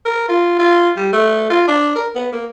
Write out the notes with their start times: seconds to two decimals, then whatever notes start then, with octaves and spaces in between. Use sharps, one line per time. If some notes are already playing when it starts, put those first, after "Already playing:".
0.05 A#4
0.29 F4
0.59 F4
0.96 G3
1.13 A3
1.50 F4
1.68 D4
1.96 A#4
2.15 B3
2.32 A#3